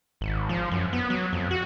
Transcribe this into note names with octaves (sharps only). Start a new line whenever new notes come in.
G#1
F3
F#2
B3
F#3
F2
F#4